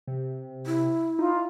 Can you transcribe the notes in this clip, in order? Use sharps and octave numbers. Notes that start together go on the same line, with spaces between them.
C3
E4
D#4 F4